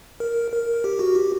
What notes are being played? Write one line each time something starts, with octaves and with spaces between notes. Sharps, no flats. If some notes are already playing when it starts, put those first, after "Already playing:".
A#4
A#4
G4
F#4
G4